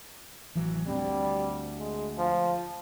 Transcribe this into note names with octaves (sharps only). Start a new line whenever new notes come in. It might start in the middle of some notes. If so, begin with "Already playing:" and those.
A1 E3 F#3
D2 G3 C4
G#3
F3